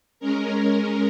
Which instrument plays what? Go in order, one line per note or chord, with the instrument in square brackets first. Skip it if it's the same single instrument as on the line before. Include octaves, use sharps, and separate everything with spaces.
[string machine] G#3 C#4 A#4